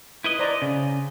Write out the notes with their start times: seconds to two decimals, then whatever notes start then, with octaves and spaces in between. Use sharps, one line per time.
0.24 E4 B4 D#5
0.39 C5 D5 A#5
0.62 C#3